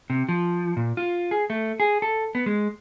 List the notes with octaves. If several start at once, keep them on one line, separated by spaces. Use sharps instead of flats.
C3
F3
A#2
F4
G#4
A3
G#4
A4
B3
G#3